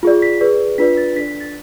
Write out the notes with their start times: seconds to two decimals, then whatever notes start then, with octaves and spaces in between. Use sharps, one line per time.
0.03 F4 G#4 D5
0.22 B6
0.41 G#4 B4 D5
0.78 D4 F4 B4 D5 B6
0.97 A6
1.16 D4 A4 D5 B6
1.28 B6
1.40 A6